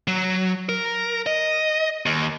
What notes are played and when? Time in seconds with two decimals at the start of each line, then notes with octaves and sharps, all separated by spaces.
0.08 F#3
0.69 A#4
1.26 D#5
2.06 D#2